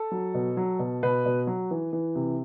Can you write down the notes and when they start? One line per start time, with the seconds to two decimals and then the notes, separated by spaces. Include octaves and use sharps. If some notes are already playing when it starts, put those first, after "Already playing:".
Already playing: A4
0.12 F#3
0.34 B2
0.57 F#3
0.79 B2
1.03 B2 B4
1.26 B2
1.47 F#3
1.71 E3
1.93 E3
2.15 C3